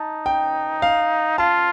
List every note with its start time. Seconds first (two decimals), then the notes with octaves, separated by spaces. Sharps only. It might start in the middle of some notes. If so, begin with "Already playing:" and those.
Already playing: D#4 A5
0.26 G5
0.82 F5
1.38 F4 A5